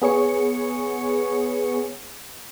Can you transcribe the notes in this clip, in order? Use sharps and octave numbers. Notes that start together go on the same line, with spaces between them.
B3 G#4 C#5 C#7